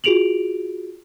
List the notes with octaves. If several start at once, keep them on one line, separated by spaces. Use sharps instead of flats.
F4 F#4 G#4 D7 F7 F#7